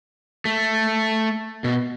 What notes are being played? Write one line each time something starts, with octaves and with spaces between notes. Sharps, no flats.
A3
B2